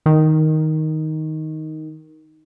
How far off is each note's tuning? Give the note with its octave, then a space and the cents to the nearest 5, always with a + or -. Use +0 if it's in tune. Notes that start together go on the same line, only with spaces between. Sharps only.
D#3 +5